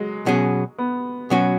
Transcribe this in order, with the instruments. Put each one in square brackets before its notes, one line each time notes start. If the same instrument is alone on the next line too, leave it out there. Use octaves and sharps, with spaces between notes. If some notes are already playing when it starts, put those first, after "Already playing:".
Already playing: [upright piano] F#3 G#3
[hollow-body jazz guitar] B2 F#3 C#4 G#4
[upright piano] B3
[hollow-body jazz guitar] B2 F#3 C#4 F#4